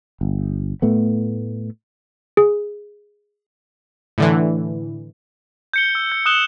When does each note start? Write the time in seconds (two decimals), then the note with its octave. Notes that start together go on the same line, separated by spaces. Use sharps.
0.21 G1
0.82 A2 A3 B3
2.37 G#4
4.18 A2 D3 E3
5.74 G6 C#7 G7
5.95 E6
6.12 G6
6.26 D#6 F#6 E7 G7